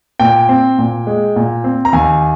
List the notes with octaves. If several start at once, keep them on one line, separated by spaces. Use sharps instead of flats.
A#2 G5
C4
A#2
G#3
A#2
C4
A#5
D#2 G#5